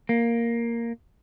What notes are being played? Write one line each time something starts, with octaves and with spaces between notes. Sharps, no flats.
A#3